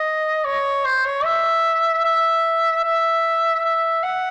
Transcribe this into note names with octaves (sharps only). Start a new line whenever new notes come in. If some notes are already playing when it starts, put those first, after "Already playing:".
Already playing: D#5
C#5
C5
C#5
E5
E5
E5
E5
F#5